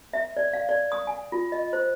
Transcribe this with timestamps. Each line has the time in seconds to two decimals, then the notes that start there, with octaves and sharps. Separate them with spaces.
0.13 E5
0.37 D5
0.53 F5
0.69 D5
0.92 D#6
1.07 G#5
1.32 F4
1.52 D#5
1.73 C5